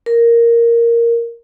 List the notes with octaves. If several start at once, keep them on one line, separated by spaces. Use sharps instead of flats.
A#4